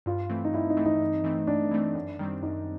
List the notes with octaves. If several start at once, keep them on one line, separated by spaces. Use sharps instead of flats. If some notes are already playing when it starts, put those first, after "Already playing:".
G2 F4
E3 A3 C4
D#4
G2 E4
D#4
E3 A3 C4
D#4
G2
E3 A3 C4
G2 D4
E3 A3 C4
F#2
D#3 G3 C4
F#2 D#4